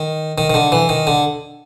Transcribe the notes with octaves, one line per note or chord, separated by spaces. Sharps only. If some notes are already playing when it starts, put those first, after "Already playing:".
Already playing: D#3
D#3
D#3
D3
E3
D#3
D3